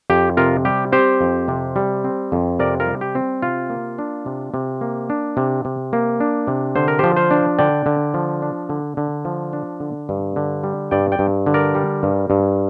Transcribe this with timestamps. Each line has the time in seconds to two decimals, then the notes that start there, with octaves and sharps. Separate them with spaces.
0.10 F2 G4
0.37 C3 F4 A#4
0.65 G3 G4
0.92 C4 G4 C5
1.21 F2
1.48 C3
1.76 G3
2.04 C4
2.32 F2
2.59 C3 A#4 D5
2.80 F4 A#4
2.87 G3
3.01 G4
3.15 C4
3.42 C3 F4
3.70 A#3
3.99 D4
4.26 C3
4.54 C3
4.81 A#3
5.10 D4
5.37 C3
5.65 C3
5.93 A#3
6.20 D4
6.47 C3
6.76 D3 C5
6.88 A#4
6.99 F3 G4 C5
7.17 C5 F5
7.31 D4
7.59 D3 D5 G5
7.86 D3
8.14 F3
8.42 D4
8.69 D3
8.97 D3
9.25 F3
9.53 D4
9.80 D3
10.09 G2
10.36 D3
10.64 G3
10.91 G2 D5 G5
11.12 D5 G5
11.19 G2
11.46 D3
11.54 A#4 D5
11.75 G3
12.03 G2
12.30 G2